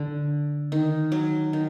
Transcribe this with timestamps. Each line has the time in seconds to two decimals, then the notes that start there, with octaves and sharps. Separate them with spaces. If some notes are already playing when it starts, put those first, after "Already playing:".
Already playing: D3
0.72 D#3
1.12 F#3
1.53 D#3